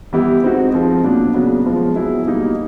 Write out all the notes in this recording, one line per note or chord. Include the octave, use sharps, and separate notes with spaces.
E3 G3 B3 E4 G4
G#3 C4 D#4 F#4
F3 G#3 C4
A#2 F#3 B3 D4
C#3 F#3 B3
F3 G#3 B3
F#3 B3 E4 G#4
B2 G3 A#3 D#4